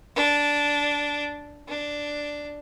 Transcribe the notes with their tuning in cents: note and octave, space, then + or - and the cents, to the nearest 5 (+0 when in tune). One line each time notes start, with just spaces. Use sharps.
D4 -10
D4 +0